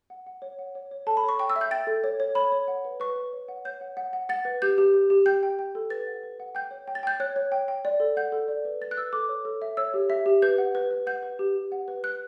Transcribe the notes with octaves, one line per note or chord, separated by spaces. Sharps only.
F#5
F#5
C#5
F#5
C#5
C#5
A4 A5
B5
C#5
C#6
G5 C#6
E6
E5
G6
G5 A6
A4
C#5
C#5
C#5 B5
C#5
F#5
B4
B4 C#6
B4
C#5
F#5
C#5 G6
F#5
F#5
F#5
F#5 A6
B4
G4 G6
G4
G4
G4
G5 G6
G5
G5
A4
B4 A6
F#5
B4
F#5
G5 G6
C#5
G5
A6
G5 G6
C#5 F#6
C#5
G5
G5
D5
A4
F#5 G6
A4
D5
B4
B4 A6
F#6
B4 E6
A4 D6
C#5
A4
E5
C#5 E6
G4
E5
G4
B4 G6
F#5
B4
B4
F#5 G6
B4
G4
G4
F#5
B4
B4 F#6